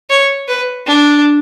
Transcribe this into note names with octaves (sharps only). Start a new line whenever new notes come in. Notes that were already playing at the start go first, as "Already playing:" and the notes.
C#5
B4
D4